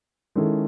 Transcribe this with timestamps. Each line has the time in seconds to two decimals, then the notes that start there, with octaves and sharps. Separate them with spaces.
0.35 D#3 G#3 C#4 E4 A4